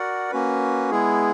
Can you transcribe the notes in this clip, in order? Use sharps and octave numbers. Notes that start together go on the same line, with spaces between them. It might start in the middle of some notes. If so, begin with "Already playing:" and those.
Already playing: F#4 A#4 D5 F#5
A#3 C#4 F#4 B4
G#3 B3 E4 G#4